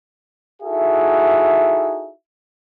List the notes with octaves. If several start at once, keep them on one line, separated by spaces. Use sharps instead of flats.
D#4 E4 F#4 G#4 A4 E5